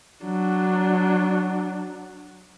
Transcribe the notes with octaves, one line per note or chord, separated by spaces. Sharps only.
F#3 D4